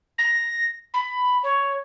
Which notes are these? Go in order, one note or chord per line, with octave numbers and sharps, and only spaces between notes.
A#6
B5
C#5